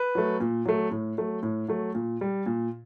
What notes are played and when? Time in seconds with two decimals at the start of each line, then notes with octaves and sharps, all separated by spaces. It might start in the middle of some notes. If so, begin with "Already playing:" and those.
Already playing: B4
0.15 F#3 A3
0.40 A#2
0.66 F#3 A3
0.91 A2
1.18 F#3 A3
1.43 A2
1.68 F#3 A3
1.95 A#2
2.21 G3
2.46 A#2